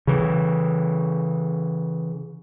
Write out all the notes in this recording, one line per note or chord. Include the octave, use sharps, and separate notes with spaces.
C#3 E3